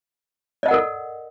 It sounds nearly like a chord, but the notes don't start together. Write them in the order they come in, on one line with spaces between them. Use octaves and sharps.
D5 D#5 F#5 A#4 A4